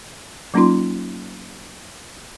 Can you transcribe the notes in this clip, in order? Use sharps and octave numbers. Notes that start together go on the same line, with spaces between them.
F#3 A#3 C#4 D#4 F4 C6